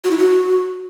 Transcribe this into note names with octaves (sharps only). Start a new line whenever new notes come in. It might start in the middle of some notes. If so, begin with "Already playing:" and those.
F#4
E4
F#4